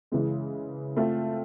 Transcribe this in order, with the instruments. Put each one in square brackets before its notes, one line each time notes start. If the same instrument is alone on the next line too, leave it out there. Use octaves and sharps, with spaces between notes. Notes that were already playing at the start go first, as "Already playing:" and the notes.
[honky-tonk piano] C#3 E3 G#3
A3 C4 F4